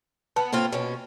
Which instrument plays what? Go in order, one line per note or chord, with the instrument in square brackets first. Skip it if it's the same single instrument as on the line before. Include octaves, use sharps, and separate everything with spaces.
[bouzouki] B3 [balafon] A5
[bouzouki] A2 C4 F4 [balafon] A#3
[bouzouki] B2 C#4